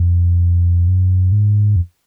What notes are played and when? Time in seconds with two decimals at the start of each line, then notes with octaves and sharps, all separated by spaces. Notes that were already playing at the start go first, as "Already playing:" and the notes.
Already playing: F2
0.88 F#2
1.32 G#2
1.76 F2